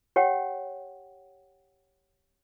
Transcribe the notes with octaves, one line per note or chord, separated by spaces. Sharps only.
G4 C#5 F#5 G5